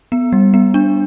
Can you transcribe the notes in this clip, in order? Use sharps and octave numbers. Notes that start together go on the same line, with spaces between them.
B3
G3
B3
D4